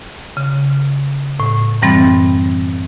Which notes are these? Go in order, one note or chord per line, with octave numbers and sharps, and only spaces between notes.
C#3
A2
F#2 E3 G3 C4 B5 A6